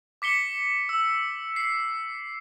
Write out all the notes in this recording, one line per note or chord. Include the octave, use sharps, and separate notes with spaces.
D6 B6 C#7 G7
E6
C7